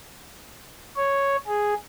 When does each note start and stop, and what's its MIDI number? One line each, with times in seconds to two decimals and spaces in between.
0.97 1.36 73
1.47 1.74 68